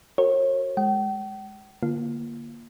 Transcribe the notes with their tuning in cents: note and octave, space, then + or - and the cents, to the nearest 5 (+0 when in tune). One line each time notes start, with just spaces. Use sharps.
F#4 +0 A#4 -30 C#5 -40
G#3 +0 G5 -45
D3 +0 A#3 +10 F4 -20